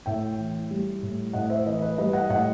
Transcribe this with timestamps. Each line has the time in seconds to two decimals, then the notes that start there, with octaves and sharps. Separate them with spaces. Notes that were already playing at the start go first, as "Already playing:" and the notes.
0.06 A2 E5 G5
0.38 E3
0.71 G3
1.02 A2
1.33 A2 D#5 F#5
1.50 C5 E5
1.66 E3 B4 D#5
1.82 B4 D#5
1.98 G3 B4 D#5
2.13 D#5 F#5
2.29 A2 D#5 F#5